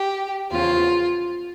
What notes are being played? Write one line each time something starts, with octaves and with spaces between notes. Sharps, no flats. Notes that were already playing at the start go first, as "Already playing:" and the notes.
Already playing: G4
E2 C#3 F3 F4